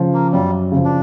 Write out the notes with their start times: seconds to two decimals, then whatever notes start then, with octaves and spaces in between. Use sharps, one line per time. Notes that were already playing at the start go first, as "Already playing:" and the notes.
Already playing: C#3 F3
0.14 A#3
0.32 F#2 G3
0.72 C#3 F3
0.85 D4